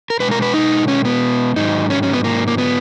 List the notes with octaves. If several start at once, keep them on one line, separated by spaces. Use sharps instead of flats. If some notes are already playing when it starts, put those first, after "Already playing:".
A#4
B2 G#3 B4
A#4
B4
D#4
C#4
B3
G#2 D#3 F#3 D#4
C#4
C#4
B3
A#3
A#3
B3